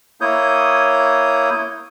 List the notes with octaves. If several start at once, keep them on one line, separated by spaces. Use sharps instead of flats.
A#3 E4 C#5 D#6 G6